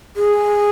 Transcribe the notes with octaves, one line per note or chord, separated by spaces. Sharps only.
G#4